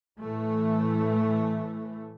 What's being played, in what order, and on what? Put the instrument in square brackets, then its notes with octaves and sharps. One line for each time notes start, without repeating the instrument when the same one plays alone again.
[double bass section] A2 E3 A3